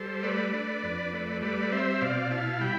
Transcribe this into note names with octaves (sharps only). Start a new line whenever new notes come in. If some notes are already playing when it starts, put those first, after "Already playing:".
Already playing: G3 A4 C5
A3 B4 D5
D4
F2
A3
G3 B4 D5
C4 C5 E5
B2 D5 F5
E4 F5 A5
G3 G5 B5